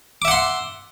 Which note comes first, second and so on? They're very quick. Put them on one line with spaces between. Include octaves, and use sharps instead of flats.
D6 E5 F#5 C6